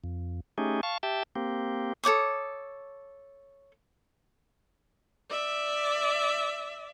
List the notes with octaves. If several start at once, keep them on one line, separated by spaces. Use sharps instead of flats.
F2
A3 C#4 D#4 G4 G#4
F5 A5 C#6
G4 E5 G5 A5
A#3 C4 G4
A4 C#5 D6 D#6
D5 E5